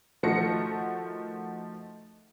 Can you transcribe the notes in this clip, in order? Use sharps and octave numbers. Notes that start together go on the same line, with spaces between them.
D#3 F3 A3 F#4 A#6 C#7